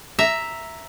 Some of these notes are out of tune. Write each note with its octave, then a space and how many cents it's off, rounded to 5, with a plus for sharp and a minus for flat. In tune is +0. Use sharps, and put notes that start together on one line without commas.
E5 +0 A#5 +0